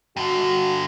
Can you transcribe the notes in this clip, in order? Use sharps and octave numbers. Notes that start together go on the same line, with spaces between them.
G2 D3 F#4